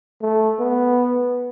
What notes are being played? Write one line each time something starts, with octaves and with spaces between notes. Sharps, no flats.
A3
B3